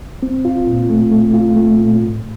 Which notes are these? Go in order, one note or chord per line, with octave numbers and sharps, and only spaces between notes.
C4
F4
A#2
A3
A3
F4
A3
A#2
A2